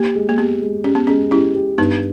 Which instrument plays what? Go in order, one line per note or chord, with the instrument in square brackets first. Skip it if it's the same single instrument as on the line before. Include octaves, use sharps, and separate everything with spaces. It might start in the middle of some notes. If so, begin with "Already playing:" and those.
Already playing: [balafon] A#3 [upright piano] G4
[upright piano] G#3
[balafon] A#3
[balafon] B3 [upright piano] G4
[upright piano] G#3
[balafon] C#4 [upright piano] G4
[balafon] B3
[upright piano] G#3 [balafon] C#4
[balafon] C#4 E4 [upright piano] G4
[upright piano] G4
[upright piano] G2 [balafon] B3 D#4